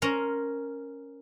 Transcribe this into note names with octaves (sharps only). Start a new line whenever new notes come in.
C#4 A#4 C5 A#5